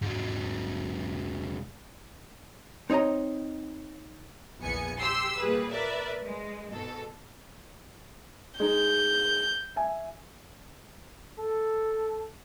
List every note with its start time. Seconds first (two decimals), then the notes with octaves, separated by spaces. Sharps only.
0.02 G#2 F#3
2.90 C4 D#4 C#5 D#5 A#5
4.59 A#1 E2 B3 G#5 C#7
4.99 G4 C6 E6
5.39 A#2 G3 G#4 B4
5.71 A#4 B4 D5 E5
6.22 G#3
6.70 G#2 B2 A4
8.60 G#3 D#4 G6
9.76 E5 G#5
11.39 A4